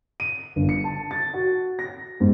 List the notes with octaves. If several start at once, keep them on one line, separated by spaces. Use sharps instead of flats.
D#7
G1
C#7
A5
A6
F#4
A#6
G#2